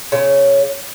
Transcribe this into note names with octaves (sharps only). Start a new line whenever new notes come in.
C#3